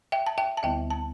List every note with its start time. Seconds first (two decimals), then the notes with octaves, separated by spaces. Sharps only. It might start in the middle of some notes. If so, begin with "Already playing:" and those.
0.12 E5 G5
0.27 A5
0.38 E5 G5
0.57 A5
0.63 D2 D3 G3 B3 E4 E5 G5
0.91 A5